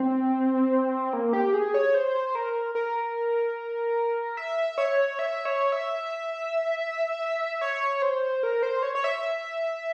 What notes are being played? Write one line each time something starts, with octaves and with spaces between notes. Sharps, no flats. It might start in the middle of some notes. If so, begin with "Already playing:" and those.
Already playing: C4
A#3
G4
G#4
C#5
C5
A#4
A#4
E5
C#5
E5
C#5
E5
C#5
C5
A#4
C5
C#5
C#5
E5